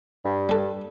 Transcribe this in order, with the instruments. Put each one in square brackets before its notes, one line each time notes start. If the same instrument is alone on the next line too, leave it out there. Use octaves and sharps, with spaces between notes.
[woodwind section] G2
[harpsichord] G3 A4